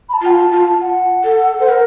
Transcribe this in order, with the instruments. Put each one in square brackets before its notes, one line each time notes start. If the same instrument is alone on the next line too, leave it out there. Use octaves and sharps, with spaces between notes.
[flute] B5
A5
[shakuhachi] F4 [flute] F#5
[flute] A5
[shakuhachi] F4
[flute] F#5
[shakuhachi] A4
C5
A#4